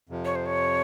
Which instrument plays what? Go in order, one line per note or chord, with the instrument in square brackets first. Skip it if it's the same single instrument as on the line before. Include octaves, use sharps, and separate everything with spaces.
[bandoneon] F2 C3 F3
[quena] C#5
C5
C#5